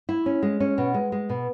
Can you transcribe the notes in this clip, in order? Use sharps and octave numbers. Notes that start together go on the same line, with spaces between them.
E4
C#4
G#3
C#4
B2
G#3
G#3
B2